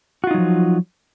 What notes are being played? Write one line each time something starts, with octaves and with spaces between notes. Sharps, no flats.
F3 F#3 D#4 F4 F#4